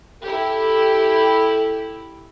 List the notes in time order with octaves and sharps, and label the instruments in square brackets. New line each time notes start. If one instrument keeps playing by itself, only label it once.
[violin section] E4 G4 [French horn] A4